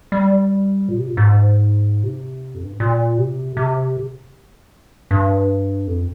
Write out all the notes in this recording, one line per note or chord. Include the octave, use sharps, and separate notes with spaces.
G3
A#2
C3
A#2
G#2
C3
F2
G2
G#2
A#2
C3
C3
G2
F2